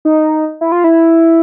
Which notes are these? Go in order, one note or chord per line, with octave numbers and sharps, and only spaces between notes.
D#4
E4
F4
E4